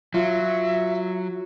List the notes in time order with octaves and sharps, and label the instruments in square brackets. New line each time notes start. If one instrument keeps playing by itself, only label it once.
[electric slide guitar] F#3 [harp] F4 [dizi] E5